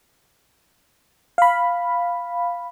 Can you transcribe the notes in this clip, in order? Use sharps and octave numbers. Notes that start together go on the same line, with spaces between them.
F5 B5